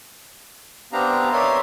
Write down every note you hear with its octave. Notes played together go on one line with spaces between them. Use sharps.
B3 C4 D4 G4 F5 A#5
A#4 C#5 D5 E5 C6 D#6